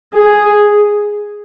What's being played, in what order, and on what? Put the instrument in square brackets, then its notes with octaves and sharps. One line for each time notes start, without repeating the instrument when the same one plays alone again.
[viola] G#4